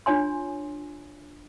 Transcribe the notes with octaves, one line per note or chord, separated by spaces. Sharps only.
D4 F4 C#5 G#5 C6